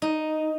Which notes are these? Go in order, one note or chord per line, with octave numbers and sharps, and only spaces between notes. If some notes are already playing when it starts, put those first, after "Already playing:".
D#4